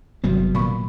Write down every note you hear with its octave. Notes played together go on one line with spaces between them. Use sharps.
G1 C3 D#3 F#3 G3 B3 F#4
A#2 D#3 B5 C#6